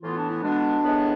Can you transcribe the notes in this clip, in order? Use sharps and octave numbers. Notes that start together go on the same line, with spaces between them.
A2 E3 B3 F4
D4
E4
B2 G#3 B3 D4
A2 E3 G#3 B3